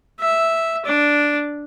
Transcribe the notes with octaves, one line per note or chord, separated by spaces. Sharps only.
E5
D4